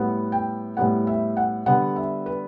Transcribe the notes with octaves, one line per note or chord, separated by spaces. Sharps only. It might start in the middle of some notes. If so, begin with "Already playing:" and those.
Already playing: A2 G3 B3 F#5
G5
A2 G3 B3 F#5
E5
F#5
D3 G3 B3 F#5
E5
B4